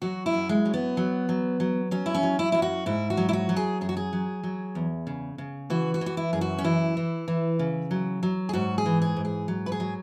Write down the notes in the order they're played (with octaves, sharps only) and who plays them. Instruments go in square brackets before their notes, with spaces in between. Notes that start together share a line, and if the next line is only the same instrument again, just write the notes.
[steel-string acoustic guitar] F#3 F#4
E4
F#2
G#3
F#3
B3
F#3
F#3
F#3
F#3 C#4
E4
C#4
F#3
E4
F#2 E4
F#4
G#2 E4
F#4
F#3
E4
F#4
F#3
G#4
F#2 G#4
F#4
G#4
F#3
F#3
E2
C#3
C#3
E3 F#4
F#4
E3
F#4
E4
F#2 G#4
F#4
C#4
E3 E4
E3
E3
C#3
F#3
F#3
G#4
G#2 F#4
G#4
E3
G#4
G#2
G#4
F#3
B4
G#4
F#3